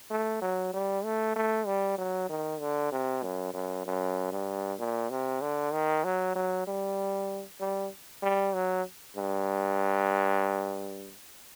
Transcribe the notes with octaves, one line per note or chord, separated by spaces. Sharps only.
A3
F#3
G3
A3
A3
G3
F#3
D#3
D3
C3
F#2
F#2
F#2
G2
A#2
C3
D3
D#3
F#3
F#3
G3
G3
G3
F#3
G2